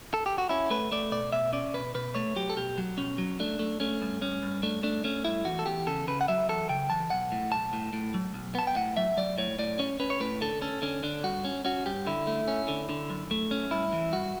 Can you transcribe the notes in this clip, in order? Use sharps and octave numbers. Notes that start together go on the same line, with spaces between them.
A4
G4
F#4
C#4 E4
A3 B4
A3 D5
B2 D5
B2 E5
C#4 D5
B2 B4
B2 B4
A3 C#5
F#3 G4
A4
B2 G4
F#3
B2 C#4
F#3
A3 D4
A3
A3 C#4
G2
G2 C#4
G2
A3 D4
A3 D4
A3 C#4
G2 E4
E2 F#4
A4
E2 G4
C#3 A4
C#3 B4
F#5
F#3 E5
E2 A4
C#3 G5
E2 A5
B1 F#5
A2
B1 A5
A2
A2
F#3
B1
B3 A5
G5
A2 F#5
F#3 E5
F#3 D5
A2 C#5
A2 D5
C#4 C#5
C#4 B4
C#5
A2 B4
D3 A4
C#4 A4
D3 C#4
D3 D4
G2 F#4
C#4
C#4 F#4
G2 G4
D3 E4
A3
C#4
D3
D3
F#2
A3
C#4
G2 E4
E3
G2 F#4